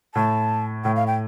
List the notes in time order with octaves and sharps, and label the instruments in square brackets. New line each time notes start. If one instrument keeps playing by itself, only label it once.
[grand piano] A2 [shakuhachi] A5
[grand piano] A2 [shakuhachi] G5
[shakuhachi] F5
G5